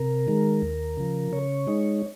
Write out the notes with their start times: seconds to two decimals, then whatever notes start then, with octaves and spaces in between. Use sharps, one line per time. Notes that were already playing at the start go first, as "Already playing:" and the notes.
Already playing: C3 A#4
0.28 D#3 G#3
0.62 D#2
0.97 C#3 F3
1.32 C#3 C#5
1.67 G#3 D#4